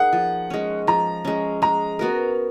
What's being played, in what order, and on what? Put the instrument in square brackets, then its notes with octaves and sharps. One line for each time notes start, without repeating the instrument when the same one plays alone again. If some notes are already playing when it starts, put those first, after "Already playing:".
Already playing: [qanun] A#3 D#4 G#4 [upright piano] F#5
[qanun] F3
G#3 C#4
[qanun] F3 [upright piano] A#5
[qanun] G#3 C#4
[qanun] G#3 [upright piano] A#5
[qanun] B3 F#4 A#4